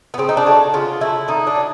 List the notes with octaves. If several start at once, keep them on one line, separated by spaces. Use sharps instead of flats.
B3
C#3 C4
D#4
D4
F#3 A3
C#3 F4
F#3 A3 E4
D3 D#4
D4
F#3